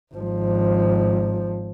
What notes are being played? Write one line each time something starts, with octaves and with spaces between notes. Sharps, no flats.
G#1 F3